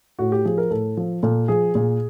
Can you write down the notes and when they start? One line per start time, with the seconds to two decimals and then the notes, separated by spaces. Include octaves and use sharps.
0.19 A2 F#4
0.32 G4
0.45 F3 G#4
0.58 A#4
0.71 A2 A4
0.97 F3
1.23 A#2 A4
1.48 F3 G#4
1.75 A#2 G#4